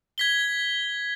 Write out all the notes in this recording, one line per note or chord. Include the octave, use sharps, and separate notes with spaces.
G#6 B6 G7